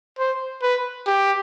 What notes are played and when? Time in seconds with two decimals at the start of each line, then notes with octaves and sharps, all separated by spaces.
0.19 C5
0.62 B4
1.06 G4